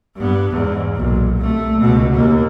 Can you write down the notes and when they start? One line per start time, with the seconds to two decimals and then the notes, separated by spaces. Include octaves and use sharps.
0.16 G2 B3
0.52 E2 G#2
0.96 B1 A#2
1.37 C2 A3
1.81 C#2 B2
2.15 D#2 A#3